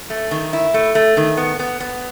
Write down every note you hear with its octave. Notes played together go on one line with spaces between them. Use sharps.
A3
D#3
E4
A3
A3
D#3
B3
B3
B3